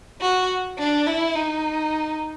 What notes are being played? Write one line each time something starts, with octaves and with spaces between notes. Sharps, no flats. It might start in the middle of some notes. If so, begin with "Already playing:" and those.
F#4
D4
E4
D#4